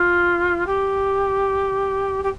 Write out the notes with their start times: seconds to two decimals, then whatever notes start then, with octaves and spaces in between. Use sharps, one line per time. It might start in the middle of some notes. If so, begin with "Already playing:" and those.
Already playing: F4
0.66 G4
2.23 G4